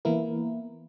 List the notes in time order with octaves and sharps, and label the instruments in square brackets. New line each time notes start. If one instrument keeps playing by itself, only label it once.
[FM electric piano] E3 A#3 B3 E4 A#4